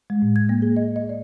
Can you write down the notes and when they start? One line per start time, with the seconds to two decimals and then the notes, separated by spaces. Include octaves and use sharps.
0.10 G#3
0.22 A2
0.36 G#6
0.49 A#3
0.62 G#4
0.76 D#5
0.96 D#5
1.09 D5